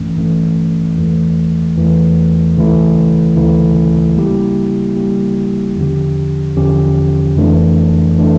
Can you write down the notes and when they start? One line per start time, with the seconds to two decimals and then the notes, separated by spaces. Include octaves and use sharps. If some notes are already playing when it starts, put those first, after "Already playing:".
Already playing: A1 G2 E3 A3 C#4
0.16 A1 G2 E3 A3 C#4
0.95 E2 E3 A3
1.76 E2 E3 A3
2.56 D2 C#3 E3 A3 E4
3.36 D2 C#3 E3 A3 E4
4.16 C#3 G3 A#3 E4 G4
4.96 C#3 G3 A#3 E4 G4
5.76 E2 D3 F3 C#4 G4
6.57 E2 D3 F3 C#4 G4
7.36 F2 E3 A3 D4
8.17 E3 A3 D4